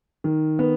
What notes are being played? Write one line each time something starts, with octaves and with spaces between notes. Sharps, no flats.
D#3
B3